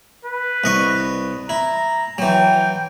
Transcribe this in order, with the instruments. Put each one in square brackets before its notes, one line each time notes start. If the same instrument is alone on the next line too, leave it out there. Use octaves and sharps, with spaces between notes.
[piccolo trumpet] B4
[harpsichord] C2 D#5 C#6
[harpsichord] E4 [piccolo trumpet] A#5
[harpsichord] E3 F#3 [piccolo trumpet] G5